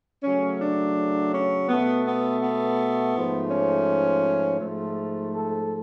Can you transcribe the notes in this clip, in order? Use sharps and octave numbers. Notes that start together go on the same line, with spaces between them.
C#3 F#3 A3 C#4
D4
C#4
B2 A3 B3
B3
B3
G#2 F3 A3
C#4
G#2 F3 A3
A4